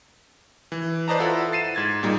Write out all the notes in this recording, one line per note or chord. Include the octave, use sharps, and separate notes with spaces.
E3
B4 C5 D5 D#5 A5 A#5
E4 F4 A4 F#5
A6 C7 D#7 E7
G#2 G#6 A6
A#2 G3 D#4 G#4